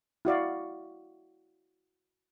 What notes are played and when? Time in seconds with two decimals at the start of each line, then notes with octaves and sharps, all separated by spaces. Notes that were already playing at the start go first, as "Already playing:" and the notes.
0.25 E4 F#4 D5 F5